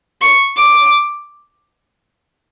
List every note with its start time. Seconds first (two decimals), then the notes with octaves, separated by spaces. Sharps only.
0.21 C#6
0.57 D6